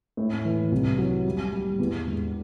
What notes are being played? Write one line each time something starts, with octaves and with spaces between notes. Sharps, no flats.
A2
E3
C2
F#3
G3
G3
E2
E1